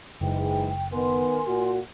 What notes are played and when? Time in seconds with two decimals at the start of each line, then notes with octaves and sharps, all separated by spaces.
0.21 F#1 G#2 E3 G#3 G5
0.92 D#3 B3 A#4 G#5 C6
1.47 A#2 F#4